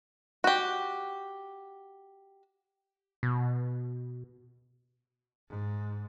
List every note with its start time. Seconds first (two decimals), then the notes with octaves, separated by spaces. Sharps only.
0.44 F#4 G4
3.23 B2
5.49 G#2